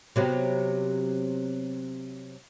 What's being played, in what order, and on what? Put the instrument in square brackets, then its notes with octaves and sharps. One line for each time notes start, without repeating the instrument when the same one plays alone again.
[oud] C3 F#3 B3